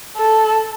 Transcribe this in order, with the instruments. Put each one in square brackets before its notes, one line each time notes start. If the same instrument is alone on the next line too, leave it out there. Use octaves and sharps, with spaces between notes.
[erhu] A4